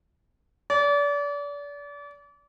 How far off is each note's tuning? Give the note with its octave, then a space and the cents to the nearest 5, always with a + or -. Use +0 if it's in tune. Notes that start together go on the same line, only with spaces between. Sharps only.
D5 -35